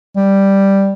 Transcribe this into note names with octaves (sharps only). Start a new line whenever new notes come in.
G3